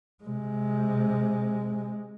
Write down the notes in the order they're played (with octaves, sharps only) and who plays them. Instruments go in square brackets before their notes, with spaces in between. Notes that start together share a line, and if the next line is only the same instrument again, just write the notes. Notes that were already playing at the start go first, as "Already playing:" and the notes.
[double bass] C3 G#3